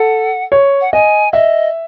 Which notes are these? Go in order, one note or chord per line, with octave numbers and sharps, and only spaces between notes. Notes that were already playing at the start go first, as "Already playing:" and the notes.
Already playing: A4 F#5
C#5
F#5
D#5 G#5
D#5 E5